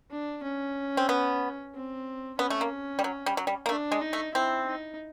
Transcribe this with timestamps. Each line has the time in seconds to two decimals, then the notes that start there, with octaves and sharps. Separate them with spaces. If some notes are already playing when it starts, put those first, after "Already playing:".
0.11 D4
0.43 C#4
0.97 C4
1.09 B3
1.74 C4
2.38 B3 C#4
2.50 A3
2.61 A#3
2.99 G3
3.04 F#3
3.26 G3
3.37 F#3
3.47 G3
3.66 A#3
3.69 A3 D4
3.92 G#3
4.02 D#4
4.13 A3
4.35 C4 E4
4.67 D#4